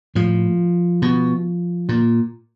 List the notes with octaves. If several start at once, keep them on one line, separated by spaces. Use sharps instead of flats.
A2 F3
B2
A#2